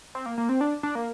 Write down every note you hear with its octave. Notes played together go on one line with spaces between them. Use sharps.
C4
A#3
A#3
C4
D4
D4
A#3